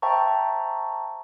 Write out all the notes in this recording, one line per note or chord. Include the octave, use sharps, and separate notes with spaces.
C5 E5 G5 A5 A#5 C#6